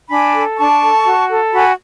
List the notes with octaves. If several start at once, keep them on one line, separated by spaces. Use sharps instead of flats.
D4 G#5 B5
A4
D4 A5 C#6
A4
F#4
A4
F#4 G#5 B5